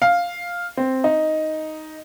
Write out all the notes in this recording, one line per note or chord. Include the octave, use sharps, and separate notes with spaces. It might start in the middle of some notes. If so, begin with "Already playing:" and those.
F5
C4
D#4